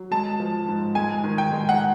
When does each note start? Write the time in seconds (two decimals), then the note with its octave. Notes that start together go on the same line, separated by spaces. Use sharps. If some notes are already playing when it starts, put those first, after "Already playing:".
Already playing: F#3
0.11 G#3 A5
0.40 F3
0.68 G#2
0.95 G#3 G#5
1.24 D#3
1.38 G5
1.52 G#3
1.69 F#5